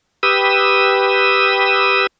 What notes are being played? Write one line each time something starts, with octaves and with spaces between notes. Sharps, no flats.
G4 B4 D#6 E6